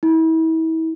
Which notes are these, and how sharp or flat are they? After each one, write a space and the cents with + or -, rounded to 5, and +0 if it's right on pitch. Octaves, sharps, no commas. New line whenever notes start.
E4 -35